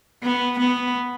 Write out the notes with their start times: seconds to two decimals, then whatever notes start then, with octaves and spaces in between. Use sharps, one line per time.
0.23 B3
0.60 B3